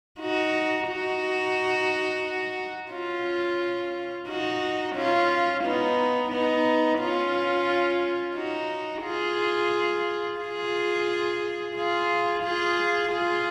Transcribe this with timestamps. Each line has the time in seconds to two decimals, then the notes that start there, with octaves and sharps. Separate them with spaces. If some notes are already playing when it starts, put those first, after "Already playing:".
0.20 D#4 F#4
0.87 D#4 F#4
2.92 C#4 F4
4.28 D#4 F#4
4.96 C#4 F4
5.64 B3 D#4
6.32 B3 D#4
7.00 C#4 F4
8.35 D#4 F#4
9.03 F4 G#4
10.40 F4 G#4
11.75 F4 G#4
12.43 F4 G#4
13.11 F4 G#4